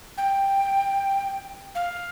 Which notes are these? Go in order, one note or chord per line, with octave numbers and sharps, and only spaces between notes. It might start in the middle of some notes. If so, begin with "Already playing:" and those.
G5
F5